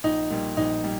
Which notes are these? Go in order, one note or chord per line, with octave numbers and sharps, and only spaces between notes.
A#1 D#4
A#2 G3
A#1 D#4
G3